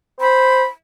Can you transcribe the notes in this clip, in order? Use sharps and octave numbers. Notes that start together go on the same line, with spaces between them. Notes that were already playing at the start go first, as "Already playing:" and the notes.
C5 B5